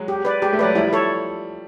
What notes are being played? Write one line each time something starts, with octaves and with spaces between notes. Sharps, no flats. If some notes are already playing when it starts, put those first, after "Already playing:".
Already playing: F#3 G#3
G4
B4 D5
G#3 G4
A3
F#3 G#3 B4 D5
F3 G3 E4
A4 C#5